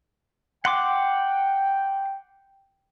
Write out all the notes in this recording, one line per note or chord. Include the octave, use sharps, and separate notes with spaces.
F#5 G5 C6 D6